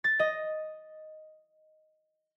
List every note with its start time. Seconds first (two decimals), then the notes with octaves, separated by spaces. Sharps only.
0.04 A6
0.19 D#5